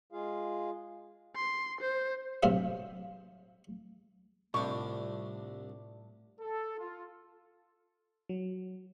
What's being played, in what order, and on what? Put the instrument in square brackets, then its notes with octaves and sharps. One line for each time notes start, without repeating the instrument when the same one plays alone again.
[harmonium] G#3 F4 G#4 F5
[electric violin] C6
C5
[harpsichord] G2 C3 F#3 C5 E5 F5
[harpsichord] C2 D4 [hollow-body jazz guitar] A2 [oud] G3 F4 [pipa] C#6
[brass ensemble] A4
F4
[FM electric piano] F#3